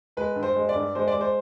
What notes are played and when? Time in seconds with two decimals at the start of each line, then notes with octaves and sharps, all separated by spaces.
0.17 G#3 B4
0.36 G2
0.43 C5
0.56 G#3
0.69 D5
0.76 G2
0.95 G#3 C5
1.08 D5
1.15 G#3
1.21 C5